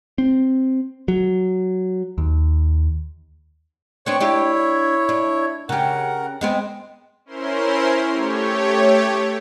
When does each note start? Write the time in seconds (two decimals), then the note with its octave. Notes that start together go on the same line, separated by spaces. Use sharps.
0.18 C4
1.08 F#3
2.18 D#2
4.06 B3 C4 D4 C#5 C#6
4.20 D4 E4 G4 C#5
5.09 D4
5.69 C#3 G4 A#4 F#5
6.41 G#3 B3 C4
7.25 C#4 E4 A#4 C5 C6
8.11 A3 G4 C#5